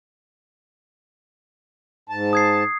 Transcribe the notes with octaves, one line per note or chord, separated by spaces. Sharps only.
G#2 A5
D#6 G#6 C7